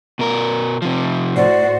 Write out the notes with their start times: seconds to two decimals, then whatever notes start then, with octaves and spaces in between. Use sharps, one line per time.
0.19 B2 A#4
0.82 C3 F3
1.37 A2 F#4 C5 D5